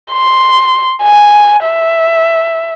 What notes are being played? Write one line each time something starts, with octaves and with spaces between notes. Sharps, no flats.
C6
G#5
E5